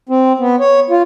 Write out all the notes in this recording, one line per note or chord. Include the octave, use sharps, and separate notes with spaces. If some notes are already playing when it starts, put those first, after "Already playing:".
C4
B3
C#5
F4